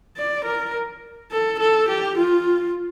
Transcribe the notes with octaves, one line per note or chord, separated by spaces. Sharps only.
D5
A#4
A4
A4
G4
F4